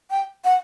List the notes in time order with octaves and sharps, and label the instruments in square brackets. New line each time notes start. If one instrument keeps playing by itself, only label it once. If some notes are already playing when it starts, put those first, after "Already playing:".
[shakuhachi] G5
F#5